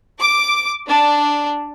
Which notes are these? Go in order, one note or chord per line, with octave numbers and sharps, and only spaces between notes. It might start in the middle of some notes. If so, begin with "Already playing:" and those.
D6
D4